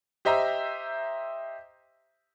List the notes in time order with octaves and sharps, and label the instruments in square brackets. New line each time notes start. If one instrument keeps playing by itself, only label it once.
[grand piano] G4 C5 D#5 E5 A#5